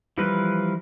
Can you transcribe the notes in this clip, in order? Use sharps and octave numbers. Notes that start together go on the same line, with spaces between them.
E3 F3 G3 A#4 B4